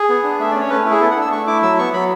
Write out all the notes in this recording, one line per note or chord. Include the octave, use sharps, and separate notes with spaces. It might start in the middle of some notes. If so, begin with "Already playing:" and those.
Already playing: G#4
B3
D4
A3 E5
C#4 D5
C#5
A3 B4
E4
G#4
B3 A4
F#5
D4 E6
A3 C#6
E4 D6
F#3 E6
B3 C#6
F#3 B5